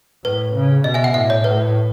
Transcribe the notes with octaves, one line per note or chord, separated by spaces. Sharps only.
A2 B4
C#3
B2 D#5
E5 G#5
F#5
A2 E5
C#5
A2 B4